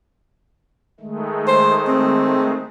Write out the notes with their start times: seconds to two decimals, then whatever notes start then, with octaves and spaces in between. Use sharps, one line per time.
1.00 D#3 G#3 A3
1.48 C5
1.88 C4